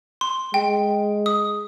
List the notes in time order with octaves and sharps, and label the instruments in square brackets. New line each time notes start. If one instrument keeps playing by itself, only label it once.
[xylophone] C6
[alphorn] G#3 [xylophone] G5
[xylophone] D#6